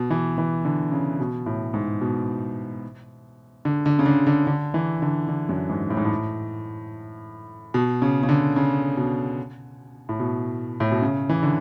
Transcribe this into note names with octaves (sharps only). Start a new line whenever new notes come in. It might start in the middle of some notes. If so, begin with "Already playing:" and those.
Already playing: B2
E3
E3
D3
C#3
B2
A2
G#2
B2
D3
D3
C#3
D3
D3
D3
E3
D3
D3
F#2
G#2
A2
G#2
A2
B2
C#3
C#3
D3
C#3
B2
A2
B2
A2
B2
C#3
E3
D3